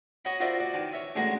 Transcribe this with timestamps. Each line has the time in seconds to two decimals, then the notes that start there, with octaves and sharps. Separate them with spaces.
0.25 F#4 C#5 D#5 F#5 B5
0.40 F4 F#4 A#4 C5 D5 E5
0.59 F#4 D5
0.74 D#3 E3
0.93 C#5 E5
1.16 A1 D3 G#3 F#4 F#5 A#5